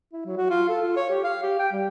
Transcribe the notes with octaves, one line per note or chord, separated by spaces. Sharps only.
E4
F#3
F#4
F4
A4
F4
C#5
G4
F5
G4
G5
G3